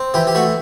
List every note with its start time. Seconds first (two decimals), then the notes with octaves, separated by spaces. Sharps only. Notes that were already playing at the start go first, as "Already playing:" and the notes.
Already playing: C4
0.14 E3 G4
0.27 G4
0.35 A3 F#4